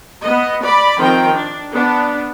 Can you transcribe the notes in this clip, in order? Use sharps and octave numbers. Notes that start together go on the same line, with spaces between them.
B3 D#5
D5 B5
D#3 F3 C4 A#4 G5
D4
B3 D4